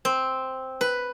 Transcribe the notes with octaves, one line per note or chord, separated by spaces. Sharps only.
C4
B4